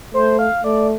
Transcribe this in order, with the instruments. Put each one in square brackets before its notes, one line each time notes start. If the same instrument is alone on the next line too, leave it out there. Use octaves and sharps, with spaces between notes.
[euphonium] A3 [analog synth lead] C5
[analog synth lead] F5
[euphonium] A3 [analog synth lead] D5